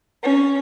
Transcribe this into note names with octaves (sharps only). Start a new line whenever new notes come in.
C#4